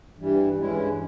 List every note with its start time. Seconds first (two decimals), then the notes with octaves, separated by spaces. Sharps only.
0.17 G2 E3 G3
0.58 G2 E3 G#3 C#4 E4